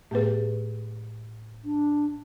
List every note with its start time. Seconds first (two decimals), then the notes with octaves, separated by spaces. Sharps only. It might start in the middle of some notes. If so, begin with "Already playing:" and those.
0.11 A2 A3 B3 G#4 B4
1.65 D4